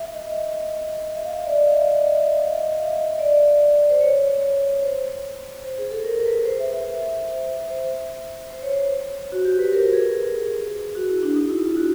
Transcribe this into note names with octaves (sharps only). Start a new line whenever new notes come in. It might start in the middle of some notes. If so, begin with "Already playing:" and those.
Already playing: E5
D#5
E5
F5
E5
D5
D#5
F5
E5
D#5
E5
F5
D#5
E5
E5
F5
D#5
D5
C5
C#5
C5
C5
G#4
A4
A#4
A#4
B4
C5
E5
E5
C5
C5
C#5
C5
F#4
G4
B4
A#4
G#4
F#4
E4
D4
D#4
E4
F4
F#4